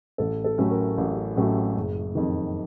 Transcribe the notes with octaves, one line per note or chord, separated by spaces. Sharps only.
A1 A4
A4
A2 F#3 A3 C#4
A#4
A1
A2 F#3 A3 C#4
F#1
F2 D#3